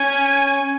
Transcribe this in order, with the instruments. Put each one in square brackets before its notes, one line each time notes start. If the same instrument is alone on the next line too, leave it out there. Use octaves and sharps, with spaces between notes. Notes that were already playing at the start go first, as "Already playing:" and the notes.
Already playing: [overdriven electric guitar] C#4 [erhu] G#5